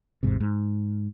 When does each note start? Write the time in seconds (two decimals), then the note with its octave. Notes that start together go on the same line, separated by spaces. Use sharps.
0.23 G#1 E2 G#2 C3
0.40 G#2